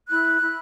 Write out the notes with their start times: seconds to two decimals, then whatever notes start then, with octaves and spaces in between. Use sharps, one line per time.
0.09 E4 F#6
0.40 E4